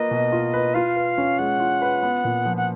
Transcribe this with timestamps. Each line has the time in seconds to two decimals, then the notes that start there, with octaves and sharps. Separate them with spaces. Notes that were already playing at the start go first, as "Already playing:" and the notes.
Already playing: A#3 F4 B4 D#5
0.11 B2
0.32 F4
0.53 B4
0.74 F4 F5
0.96 B4
1.18 C#4
1.39 G#3 F#5
1.60 F4
1.82 B4
2.03 B3
2.24 A#2
2.45 F3
2.57 F#5